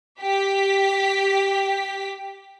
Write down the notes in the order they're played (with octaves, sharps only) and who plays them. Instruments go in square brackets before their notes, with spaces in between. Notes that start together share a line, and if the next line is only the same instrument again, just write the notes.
[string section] G4 B6